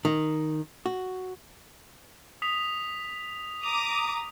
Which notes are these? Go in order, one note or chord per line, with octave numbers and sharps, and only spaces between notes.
D#3
F#4
D#6 B6 F7
A#5 D6 D#6 F7